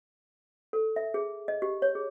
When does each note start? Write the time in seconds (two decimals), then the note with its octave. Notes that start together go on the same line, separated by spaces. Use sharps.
0.73 A4
0.96 E5
1.14 G#4
1.48 D#5
1.62 G4
1.82 C#5
1.95 G#4